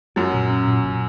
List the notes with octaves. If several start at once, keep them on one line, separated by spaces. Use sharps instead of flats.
F#2 F#3 C#4
A#2
C#4
A#2
A#2